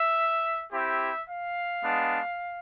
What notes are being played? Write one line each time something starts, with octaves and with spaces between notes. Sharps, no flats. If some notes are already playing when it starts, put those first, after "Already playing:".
Already playing: E5
C4 E4 G4 E5
F5
G#3 B3 D4